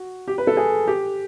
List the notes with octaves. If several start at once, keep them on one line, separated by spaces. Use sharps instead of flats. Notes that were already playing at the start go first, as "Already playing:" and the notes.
Already playing: F#4
G4
B4
A4
G#4
G4